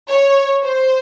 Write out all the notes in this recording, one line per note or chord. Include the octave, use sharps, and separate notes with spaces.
C#5
C5